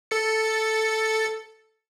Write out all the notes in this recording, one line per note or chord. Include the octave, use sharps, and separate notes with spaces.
A4 A6 C#7